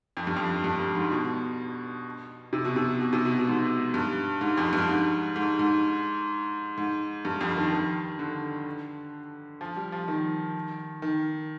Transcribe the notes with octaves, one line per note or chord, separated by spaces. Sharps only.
F2
G2
F2
G2
G2
G#2
B2
C3
B2
C3
B2
C3
B2
B2
G#2
G2
G#2
F2
G2
G#2
G#2
G#2
G#2
G2
F2
D#3
D#3
D3
F3
G3
F3
D#3
D#3